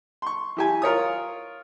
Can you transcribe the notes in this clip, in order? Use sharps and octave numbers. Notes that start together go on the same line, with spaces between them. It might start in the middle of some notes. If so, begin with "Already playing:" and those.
C6 C#6
E3 G4 G#5
F4 A#4 C#5 D#6